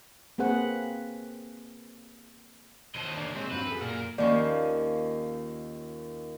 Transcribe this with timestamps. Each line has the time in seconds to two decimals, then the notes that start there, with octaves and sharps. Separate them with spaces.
0.38 A#3 C4 G#4 B4 F#5
2.95 D#2 C4 D#5 A5
3.17 C3 A#3 D4
3.35 G#3 C4 G#4 C5 C#5
3.52 G2 F4 F#4 B4
3.67 F#2 G#4 A4
3.82 A#2 A#4
4.18 D#2 D#3 F3 C#4 D5